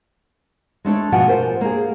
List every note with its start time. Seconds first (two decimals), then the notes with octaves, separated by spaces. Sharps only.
0.85 G#3 A3 D4 C#5
1.12 B2 F3 D4 F#4 F#5 G#5
1.28 A#4 C5
1.61 A#3 G#4